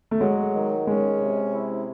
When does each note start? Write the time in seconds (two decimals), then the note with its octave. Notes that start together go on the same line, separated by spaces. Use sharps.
0.11 A3
0.21 F#3 G#3
0.55 D#3
0.87 G#3 C#4
1.21 C3
1.54 E4